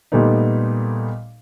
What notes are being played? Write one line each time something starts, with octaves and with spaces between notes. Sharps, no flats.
A#2 G3 A3 B3 D#4